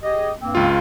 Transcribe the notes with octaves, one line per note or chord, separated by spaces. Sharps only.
G4 G#4 D#5
G2 A#3 C4
C#2 F4